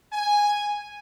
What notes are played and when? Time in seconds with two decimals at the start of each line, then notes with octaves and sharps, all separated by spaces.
0.13 G#5